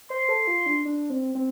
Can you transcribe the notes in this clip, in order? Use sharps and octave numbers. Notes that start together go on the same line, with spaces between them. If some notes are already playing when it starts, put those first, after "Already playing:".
C5 C6
A4
F4
D4
D4
C4
C4